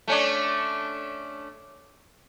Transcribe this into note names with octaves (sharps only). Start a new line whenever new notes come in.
A3 C#4 D4